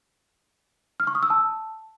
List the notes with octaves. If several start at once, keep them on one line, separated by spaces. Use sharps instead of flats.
F6
C#6
D#6
E6
A5